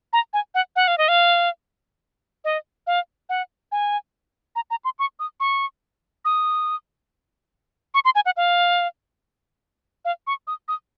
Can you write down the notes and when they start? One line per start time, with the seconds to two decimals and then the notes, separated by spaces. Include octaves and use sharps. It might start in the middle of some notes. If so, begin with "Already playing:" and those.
0.13 A#5
0.33 G#5
0.55 F#5
0.76 F#5
0.88 F5
0.98 D#5
1.08 F5
2.45 D#5
2.87 F5
3.29 F#5
3.72 G#5
4.56 A#5
4.71 A#5
4.85 C6
4.99 C#6
5.20 D#6
5.40 C#6
6.25 D#6
7.94 C#6
8.05 C6
8.15 G#5
8.26 F#5
8.37 F5
10.05 F5
10.27 C#6
10.47 D#6
10.68 D#6